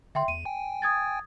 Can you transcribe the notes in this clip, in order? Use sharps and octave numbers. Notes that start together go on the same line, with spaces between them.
D3 E5 G5 C6
E2 D#7
G5 G#5
D#6 G#6 A6